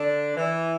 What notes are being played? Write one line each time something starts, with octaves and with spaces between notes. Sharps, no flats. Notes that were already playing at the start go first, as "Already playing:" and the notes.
Already playing: D3 D4
E3